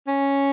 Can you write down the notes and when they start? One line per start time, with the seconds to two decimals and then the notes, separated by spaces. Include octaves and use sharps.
0.08 C#4